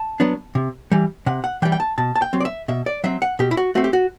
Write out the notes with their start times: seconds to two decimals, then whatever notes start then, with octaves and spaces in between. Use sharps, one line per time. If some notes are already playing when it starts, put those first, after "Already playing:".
Already playing: A5
0.20 F#3 B3 D4
0.55 C3
0.92 E3 G3
1.26 C3 F#5
1.44 F#5
1.62 E3 G5
1.65 G3
1.72 G5
1.80 A5
1.98 B2 A5
2.16 A5
2.22 G5
2.33 F#3 C4
2.40 D5
2.45 E5
2.68 B2 E5
2.86 D5
3.04 F#3 C4 E5
3.22 F#5
3.39 B2 G4
3.51 E4
3.57 F#4
3.75 A3 C4 F#4
3.84 G4
3.93 F#4